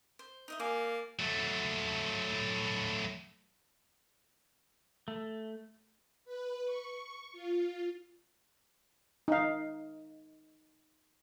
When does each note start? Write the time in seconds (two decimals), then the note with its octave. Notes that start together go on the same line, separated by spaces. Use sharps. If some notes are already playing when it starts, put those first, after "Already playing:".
0.19 C5
0.48 D#4 D#5 E5
0.60 A#3 D5 G#5
1.19 F#3 A3
5.08 A3
6.25 B4
6.65 C#6
7.32 F4
9.28 D#4 F5